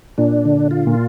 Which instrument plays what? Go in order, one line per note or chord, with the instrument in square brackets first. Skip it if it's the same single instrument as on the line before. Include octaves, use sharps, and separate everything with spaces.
[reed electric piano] A#2 [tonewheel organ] D4
[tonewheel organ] D3
F4
[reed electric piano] A#2